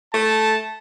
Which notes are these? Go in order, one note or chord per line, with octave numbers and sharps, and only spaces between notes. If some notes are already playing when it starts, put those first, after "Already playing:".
A3 A5